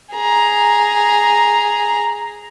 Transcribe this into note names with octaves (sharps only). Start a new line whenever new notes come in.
G#4 A#5